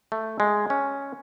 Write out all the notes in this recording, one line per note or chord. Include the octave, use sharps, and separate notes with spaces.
A3
G#3
C#4